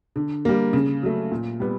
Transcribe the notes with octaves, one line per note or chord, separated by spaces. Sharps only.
D3
G3 A#3
C#3
F#3 A3
A#2
G3 B3